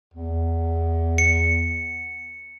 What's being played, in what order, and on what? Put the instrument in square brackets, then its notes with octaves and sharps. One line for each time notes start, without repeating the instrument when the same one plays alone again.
[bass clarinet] E2
[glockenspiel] C#7